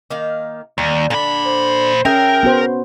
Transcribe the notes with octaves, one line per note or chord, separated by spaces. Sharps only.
D#3 A#3 F5
D#2 G3
A#2 D3 D4 B5
C5
C#4 G#4 A#4 E5 G5
B3 F#4 C5